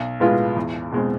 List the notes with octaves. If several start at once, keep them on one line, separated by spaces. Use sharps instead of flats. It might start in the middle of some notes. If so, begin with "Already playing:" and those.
Already playing: B1
A2 G#3 B3 F4
E2
B2 G#3 C4